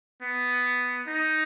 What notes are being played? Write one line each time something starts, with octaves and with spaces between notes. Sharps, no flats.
B3
D#4